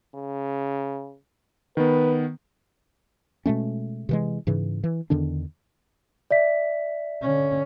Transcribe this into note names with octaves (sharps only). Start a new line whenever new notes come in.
C#3
D#3 B3 B4
B2 G#3 A3 C#4
C3 E3 G#3
G#2 C#3 E3
E3
E2 D3 D#3 D4
D5 E5 B6
D3 C#4